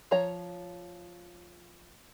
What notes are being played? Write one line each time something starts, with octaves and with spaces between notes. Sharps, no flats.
F3 C#5 A#5